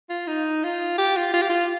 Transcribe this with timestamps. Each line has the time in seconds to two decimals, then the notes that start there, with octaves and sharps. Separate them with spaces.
0.10 F4
0.27 D#4
0.64 F4
0.98 G4
1.17 F4
1.34 F4
1.42 G4
1.50 F4